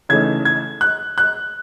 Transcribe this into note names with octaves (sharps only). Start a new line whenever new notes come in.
C#3 E3 A3 D#4 G#6
G#6
F#6
F#6